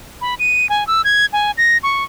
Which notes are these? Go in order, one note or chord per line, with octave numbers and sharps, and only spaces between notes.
B5
D#7
G#5
E6
G#6
G#5
A#6
C#6